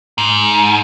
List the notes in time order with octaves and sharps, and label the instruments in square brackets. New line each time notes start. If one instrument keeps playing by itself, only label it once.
[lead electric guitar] G#2